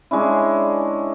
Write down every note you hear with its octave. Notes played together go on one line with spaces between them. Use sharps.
G#3 C#4 D4 E4